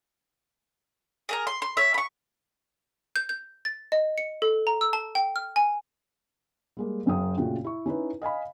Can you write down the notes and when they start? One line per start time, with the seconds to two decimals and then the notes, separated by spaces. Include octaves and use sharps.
1.29 G#4 A#4 A#5
1.47 C6
1.62 C6
1.77 C#5 E5
1.94 B5 C#6
3.16 G6
3.29 G6
3.65 A6
3.92 D#5
4.18 C#7
4.42 A4
4.67 A#5
4.81 E6
4.93 A5
5.15 G5
5.36 F6
5.56 G#5
6.77 G3 G#3 A#3
7.06 F#1 F#2 F5 G5 D#6
7.38 A#2 C#3 A3 F4 F#4 G5
7.64 E4 C#6
7.86 C#4 D#4 E4 B4
8.22 D#5 F5 G#5 B5